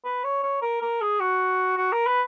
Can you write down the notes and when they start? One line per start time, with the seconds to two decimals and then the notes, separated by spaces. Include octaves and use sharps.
0.05 B4
0.24 C#5
0.43 C#5
0.62 A#4
0.82 A#4
1.01 G#4
1.20 F#4
1.77 F#4
1.92 A#4
2.07 B4